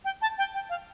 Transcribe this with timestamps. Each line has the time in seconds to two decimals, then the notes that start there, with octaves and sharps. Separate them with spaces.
0.04 G5
0.22 A5
0.38 G5
0.54 G5
0.69 F5